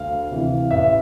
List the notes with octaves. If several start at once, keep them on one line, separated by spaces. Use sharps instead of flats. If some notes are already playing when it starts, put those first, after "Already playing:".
Already playing: D2 F5
C3 E3
A1 E5